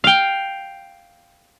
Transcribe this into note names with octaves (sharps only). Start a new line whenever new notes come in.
F5 G5